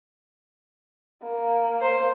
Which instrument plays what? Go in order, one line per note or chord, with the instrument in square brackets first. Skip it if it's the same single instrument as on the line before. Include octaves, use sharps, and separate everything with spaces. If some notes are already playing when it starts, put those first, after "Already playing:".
[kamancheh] A#3
[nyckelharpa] C5